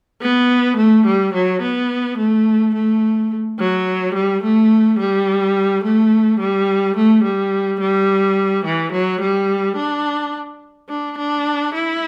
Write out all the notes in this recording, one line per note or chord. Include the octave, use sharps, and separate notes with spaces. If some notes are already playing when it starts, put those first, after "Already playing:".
B3
A3
G3
F#3
B3
A3
A3
F#3
G3
A3
G3
A3
G3
A3
G3
G3
E3
F#3
G3
D4
D4
D4
E4